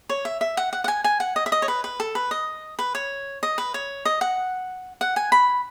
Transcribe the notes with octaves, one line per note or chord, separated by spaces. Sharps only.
C#5
E5
E5
F#5
F#5
F#5
G#5
G#5
F#5
D#5
E5
D#5
C#5
B4
B4
A4
B4
D#5
B4
C#5
D#5
B4
C#5
D#5
F#5
F#5
G#5
B5